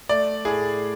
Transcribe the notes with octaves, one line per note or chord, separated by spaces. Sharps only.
A3 D5
A2 G#4